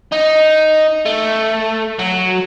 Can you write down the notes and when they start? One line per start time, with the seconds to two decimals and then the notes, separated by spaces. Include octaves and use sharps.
0.12 D#4
1.05 A3
1.99 F#3